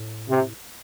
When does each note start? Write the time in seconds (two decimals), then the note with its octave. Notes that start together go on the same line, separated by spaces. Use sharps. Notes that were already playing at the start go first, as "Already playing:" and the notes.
Already playing: A2
0.29 C3